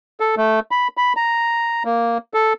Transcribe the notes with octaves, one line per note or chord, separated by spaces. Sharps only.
A4
A3
B5
B5
A#5
A#3
A4